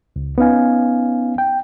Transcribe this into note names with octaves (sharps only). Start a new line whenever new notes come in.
C#2
B3 C#4 D#4 F5 G#5
G5